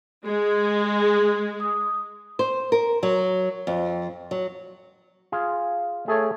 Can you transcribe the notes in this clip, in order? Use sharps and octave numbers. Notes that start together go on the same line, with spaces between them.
G#3 G#4
D#6
C5
A#4
F#3
F2
F#3
F4 G#4
A3 G#4 C#5